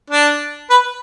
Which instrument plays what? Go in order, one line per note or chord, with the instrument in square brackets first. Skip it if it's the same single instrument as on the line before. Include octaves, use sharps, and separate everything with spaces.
[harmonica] D4
B4